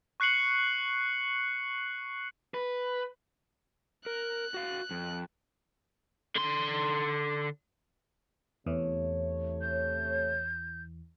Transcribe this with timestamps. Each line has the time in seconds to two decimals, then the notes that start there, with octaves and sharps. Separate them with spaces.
0.20 C#6 F#6 C7 C#7 F#7
2.54 B4
4.06 A#4 F#6
4.54 F#4 F5
4.91 F2
6.36 D3 C6
8.66 E2 C3 E3 A3 C#5
9.61 G6